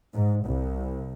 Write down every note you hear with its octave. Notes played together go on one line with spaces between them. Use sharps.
G#2
C2